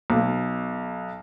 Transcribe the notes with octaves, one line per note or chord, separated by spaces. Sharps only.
B1